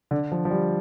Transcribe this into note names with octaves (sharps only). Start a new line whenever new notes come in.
D3
F3
F3
G3